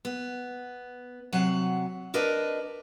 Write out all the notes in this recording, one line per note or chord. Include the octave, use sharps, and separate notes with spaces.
B3
C3 F#3 F#5
D4 A#4 B4 D#5